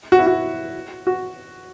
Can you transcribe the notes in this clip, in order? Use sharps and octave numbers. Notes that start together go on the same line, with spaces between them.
F#4
E4
F#4
F#4